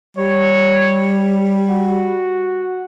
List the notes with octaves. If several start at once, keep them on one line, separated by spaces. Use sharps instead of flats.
G3 C#5
F#4